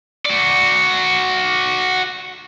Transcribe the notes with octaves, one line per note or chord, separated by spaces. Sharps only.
F#4 D5